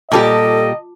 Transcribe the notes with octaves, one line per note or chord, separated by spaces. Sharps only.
A#2 G3 F4 G4 A4 D#5 A5 D6